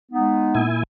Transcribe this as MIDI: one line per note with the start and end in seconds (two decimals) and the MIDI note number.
0.12 0.65 56
0.12 0.65 59
0.12 0.65 63
0.55 0.83 46
0.55 0.83 64
0.55 0.83 80